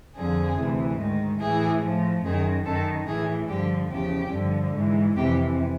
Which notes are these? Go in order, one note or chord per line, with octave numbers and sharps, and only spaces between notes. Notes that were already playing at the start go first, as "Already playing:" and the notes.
F2 D3 F3 G#4
D2 C3 E3
G#2 D#3
A2 E3 G#4
A2 F3
F#2 D#3 G#4
F#2 D#3 A4
A2 E3 G#4
G2 D3 F3 G4
E2 C#3 F3 G4
G2 D3 F3
G#2 E3
F2 C3 E3 G4